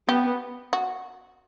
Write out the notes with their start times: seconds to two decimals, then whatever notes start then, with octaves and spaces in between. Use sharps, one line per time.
0.08 B3 G4
0.73 F#4